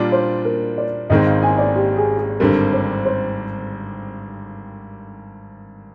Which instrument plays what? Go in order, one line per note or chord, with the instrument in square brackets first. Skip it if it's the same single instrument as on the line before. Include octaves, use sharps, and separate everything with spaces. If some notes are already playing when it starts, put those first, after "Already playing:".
Already playing: [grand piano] A#2 G3 D4 F4 [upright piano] D5
[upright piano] C5
A#4
D5
[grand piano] G#1 G#2 D#3 G#3 C4 [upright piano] D#5
[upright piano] F5
G#5
D5
G4
G#4
G#4
[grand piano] G#1 G2 D3 G3 C4 [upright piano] A#4
[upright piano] C5
C5